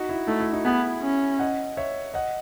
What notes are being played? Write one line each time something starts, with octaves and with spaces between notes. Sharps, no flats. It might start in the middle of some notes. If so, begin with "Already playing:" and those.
Already playing: D#4 F#4
E4
A3 D#4
E4
D#4 F#4
B3 E4 G#4
C#4
D#5 F#5
C#5 E5
D#5 F#5